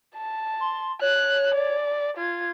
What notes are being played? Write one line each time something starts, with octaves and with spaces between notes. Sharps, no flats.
A5
C6
C#5 F#6
D5
F4 G#6